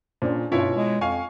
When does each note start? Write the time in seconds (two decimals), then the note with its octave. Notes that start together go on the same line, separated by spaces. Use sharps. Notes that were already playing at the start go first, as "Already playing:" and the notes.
0.22 A#2 C#4 D4 C5
0.52 G2 B2 C#4 E4 F4 C#5
0.75 G#3
1.01 F2 F5 G#5 C#6